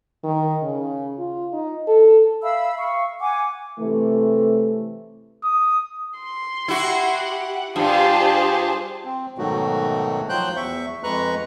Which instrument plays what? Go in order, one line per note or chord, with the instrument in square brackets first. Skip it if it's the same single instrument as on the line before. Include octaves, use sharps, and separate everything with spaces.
[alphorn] D#3
C#3
F4
D#4
A4
[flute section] E5 F5 B5 E6
F5 C#6
F#5 G#5 D6
[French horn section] C3 E3 A3
[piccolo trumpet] D#6
[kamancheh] C6
[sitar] E4 F#4 [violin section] G4 F#5
[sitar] G2 [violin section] F4 C5 A5 [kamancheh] G4 G#4
[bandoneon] C4
G#2 B2 D#3 F#3 A3 F#4
F3 F#3 C5 G5 F#6 G6
E2 E5 C#6
F2 G#3 B4 A#5 C#6 F#6